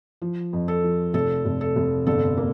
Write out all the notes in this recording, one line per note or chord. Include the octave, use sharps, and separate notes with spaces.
F3
F2
A4
F3
F1 A4
F1
A4
F1
G1 A4
A#3